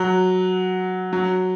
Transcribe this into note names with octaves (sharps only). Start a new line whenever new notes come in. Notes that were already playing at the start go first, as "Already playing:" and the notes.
Already playing: F#3
F#3